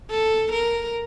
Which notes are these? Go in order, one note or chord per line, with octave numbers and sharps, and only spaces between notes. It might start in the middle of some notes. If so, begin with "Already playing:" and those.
A4
A#4